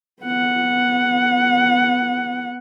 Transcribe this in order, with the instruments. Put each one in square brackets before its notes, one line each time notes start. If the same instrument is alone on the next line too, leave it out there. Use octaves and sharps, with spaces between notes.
[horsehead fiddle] B3 F#5